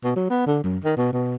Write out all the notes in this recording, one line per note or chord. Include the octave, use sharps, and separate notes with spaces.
B2
F#3
B3
D3
F#2
D#3
B2
B2